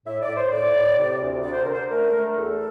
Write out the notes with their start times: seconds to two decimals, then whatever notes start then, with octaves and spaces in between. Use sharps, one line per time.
0.06 A2 E5
0.21 D5
0.28 A2
0.36 C5
0.52 A2 D5
0.74 A2
0.98 C3
1.20 D2
1.43 D3 D5
1.53 C5
1.63 D3 A#4
1.72 C5
1.89 A3 A#4
2.12 A3
2.35 E2 A4